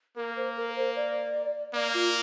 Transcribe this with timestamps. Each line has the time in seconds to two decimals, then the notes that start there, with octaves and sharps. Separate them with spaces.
0.17 A#3 A#4
0.36 C5
0.57 A#4
0.76 C5
0.96 D5
1.74 A#3 D5
1.94 F4